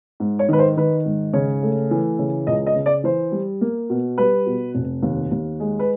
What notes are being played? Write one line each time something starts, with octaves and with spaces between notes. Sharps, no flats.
G#2
C#5
D#3 B4
C5
D#3 B4
G#2
C#3 C#5
A3
E3
C#3
C#2 D#5
D#5
C#3
D5
E3 C5
G3
A#3
B2
G3 B4
B2
F1
D#2
D#2
G#3
B4